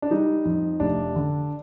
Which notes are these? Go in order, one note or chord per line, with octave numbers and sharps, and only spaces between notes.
D4
G3 D#4
F2
F1 D4
D3